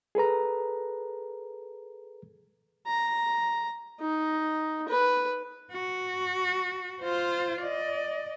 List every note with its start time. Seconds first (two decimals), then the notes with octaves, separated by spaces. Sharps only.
0.15 G#4 A4 B4 A#5
2.87 A#5
4.00 D#4
4.88 B4
5.73 F#4
7.01 F4 C5
7.62 D5 D#5